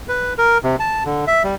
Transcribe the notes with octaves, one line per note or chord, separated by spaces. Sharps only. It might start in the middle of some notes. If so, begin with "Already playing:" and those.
B4
A#4
C3
A5
D3
E5
G3